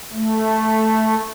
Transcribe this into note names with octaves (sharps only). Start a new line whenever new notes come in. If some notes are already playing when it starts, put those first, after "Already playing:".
A3